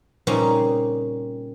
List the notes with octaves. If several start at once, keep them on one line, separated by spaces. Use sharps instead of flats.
A#2 C#3 G3 C4 C#4 D#4